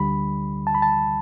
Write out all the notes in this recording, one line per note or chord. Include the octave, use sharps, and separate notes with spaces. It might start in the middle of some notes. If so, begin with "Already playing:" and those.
Already playing: D2 D3 G3 B5
A5
B5
A5